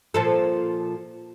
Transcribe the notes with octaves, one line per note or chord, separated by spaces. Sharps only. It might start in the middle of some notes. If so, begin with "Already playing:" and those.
A#2 F3 A4